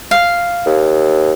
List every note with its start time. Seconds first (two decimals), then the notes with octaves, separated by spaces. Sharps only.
0.11 F5
0.66 D#2